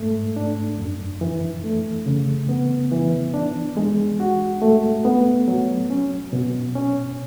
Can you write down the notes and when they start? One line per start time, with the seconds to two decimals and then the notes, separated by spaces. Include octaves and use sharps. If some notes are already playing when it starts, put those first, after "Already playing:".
Already playing: G#2 A3
0.36 D4
0.78 F#2
1.21 E3
1.64 A3
2.06 C#3
2.49 B3
2.91 E3
3.34 D4
3.77 G#3
4.20 F#4
4.62 A3
5.05 B3
5.48 F#3
5.90 C#4
6.33 B2
6.75 C#4